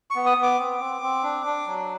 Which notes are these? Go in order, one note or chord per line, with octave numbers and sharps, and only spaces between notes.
C#6
B3
D#6
B3
D6
C4
C4
C4
D4
D4
F#3